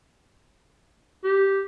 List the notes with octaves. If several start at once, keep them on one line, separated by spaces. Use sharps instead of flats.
G4